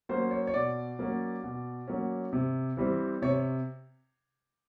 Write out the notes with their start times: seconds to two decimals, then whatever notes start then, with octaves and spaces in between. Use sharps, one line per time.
0.09 F#3 A#3 C#4 C5
0.31 C#5
0.47 C#5
0.54 B2 D5
0.99 F#3 A#3 C#4
1.43 B2
1.88 F#3 A#3 C#4
2.33 C3
2.77 E3 G3 C4
3.22 C3 C#5